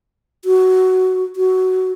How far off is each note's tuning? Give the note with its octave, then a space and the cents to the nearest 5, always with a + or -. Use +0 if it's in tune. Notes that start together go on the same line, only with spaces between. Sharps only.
F#4 +10
F#4 +10